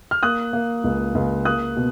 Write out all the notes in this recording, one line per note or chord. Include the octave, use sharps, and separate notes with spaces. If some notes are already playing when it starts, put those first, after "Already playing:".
F6
A#3 D#6 F#6
A#3
C#2
C#2
A#3 D#6 F#6
B2